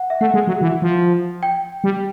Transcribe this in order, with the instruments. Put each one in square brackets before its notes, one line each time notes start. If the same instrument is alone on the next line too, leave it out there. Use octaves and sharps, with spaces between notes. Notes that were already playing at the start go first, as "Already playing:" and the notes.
Already playing: [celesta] F#5
E5
[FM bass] A3 [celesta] F#5
[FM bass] G#3
F#3
E3
F3
[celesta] G5
[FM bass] G3